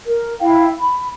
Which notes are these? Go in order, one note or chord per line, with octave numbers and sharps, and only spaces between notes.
A#4
E4 F5 G5
B5